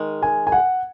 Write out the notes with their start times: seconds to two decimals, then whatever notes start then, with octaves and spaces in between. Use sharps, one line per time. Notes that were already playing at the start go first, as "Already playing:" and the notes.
Already playing: D#3 G#3
0.23 G#5
0.47 G#5
0.52 F#5